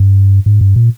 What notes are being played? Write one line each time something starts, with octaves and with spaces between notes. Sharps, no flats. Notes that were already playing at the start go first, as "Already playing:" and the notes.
Already playing: G2
G#2
G2
A#2